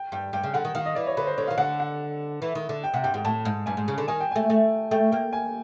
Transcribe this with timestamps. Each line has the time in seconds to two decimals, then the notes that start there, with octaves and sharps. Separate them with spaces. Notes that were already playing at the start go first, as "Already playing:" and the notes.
Already playing: G5
0.12 G2 G5
0.33 G2 G5
0.43 C#3
0.54 D3 F#5
0.65 D#3
0.75 D#3 F5
0.86 D#5
0.95 E3 D5
1.07 C#5
1.17 D3 B4
1.27 C5
1.38 D3 C#5
1.47 D#3 F5
1.58 D3 F#5
1.80 F#5
2.42 E3
2.55 D#3
2.69 D3
2.84 G5
2.94 C3 F#5
3.04 G2 G5
3.14 G#2 G5
3.25 A2 A5
3.45 G#2
3.66 G2 G#5
3.77 G#2
3.88 C#3
3.98 D3
4.08 D#3 G#5
4.20 G5
4.31 A3 G#5
4.50 A3
4.91 A3 G5
5.12 A#3 G5
5.33 G#5